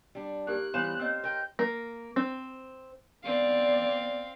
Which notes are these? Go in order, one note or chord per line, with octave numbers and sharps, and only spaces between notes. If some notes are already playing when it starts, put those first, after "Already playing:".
G3 D4
A#3 D#4 G4 A#4 F#6
E3 G3 B3 C5 C#5 F5 E7
A#3 C4 C#5 D#5 E6
A#4 G5 G6
A#3
C4
B3 C4 D5 F5